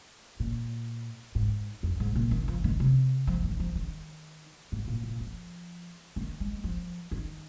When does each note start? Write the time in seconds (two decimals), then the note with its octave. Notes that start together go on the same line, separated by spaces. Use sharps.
0.40 A#2
1.35 G#2
1.83 F2
2.00 G#2
2.15 A#2
2.31 D#3
2.48 F3
2.64 D#3
2.80 C3
3.27 F3
3.44 D#3
3.60 F3
3.75 D#3
4.72 G#2
4.88 A#2
5.04 A#2
5.20 F3
6.16 D#3
6.40 G#3
6.64 F3
7.11 D#3